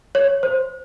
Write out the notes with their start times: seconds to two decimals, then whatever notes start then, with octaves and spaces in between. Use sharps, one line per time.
0.15 C#5
0.43 C5